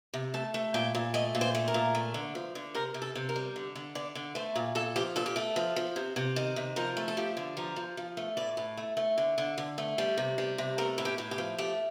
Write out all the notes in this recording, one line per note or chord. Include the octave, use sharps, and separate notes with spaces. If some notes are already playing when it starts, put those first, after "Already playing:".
C3
A3 A5
A3
A#2 G5
A#2
A3 D#5
A#2
C5
A3
A#4
A#2
A3
D3
F3
D3
C3 A#4
C3
A4
C3
A#4
G3
D3
D3
D3 D5
D3
A3 C5
A#2
A#2 A4
F3 G4
A#2 A4
G4
A3 A4
F3
F3
C3
C3
D#3
C3
F3 A#4
A3
A4
F3 G4
D3
F3 A#4
F3
F3
A3
A2 D5
A2
A3
A3
D3
D3
D3
A3
G3
C3
G3
C3
A3 A#4
A2
G4
A2
G4
F3
A3 G4